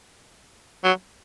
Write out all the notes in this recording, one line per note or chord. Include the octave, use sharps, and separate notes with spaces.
F#3